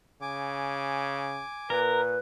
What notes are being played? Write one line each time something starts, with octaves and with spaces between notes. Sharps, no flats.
C#3 G#5 D6
A#2 A#4 B4